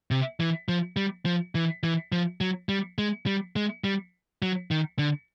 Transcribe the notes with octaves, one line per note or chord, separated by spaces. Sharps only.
C3
E3
F3
G3
F3
E3
E3
F3
F#3
G3
G#3
G3
G#3
G3
F#3
D#3
D3